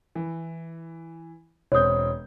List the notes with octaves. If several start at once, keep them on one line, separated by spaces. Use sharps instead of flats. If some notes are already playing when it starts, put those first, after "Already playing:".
E3
E1 C4 C#5 D#6 G6